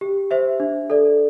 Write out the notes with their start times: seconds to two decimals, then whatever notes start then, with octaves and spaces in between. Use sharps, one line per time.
0.01 G4
0.31 C5 E5
0.60 D4
0.90 A4 D5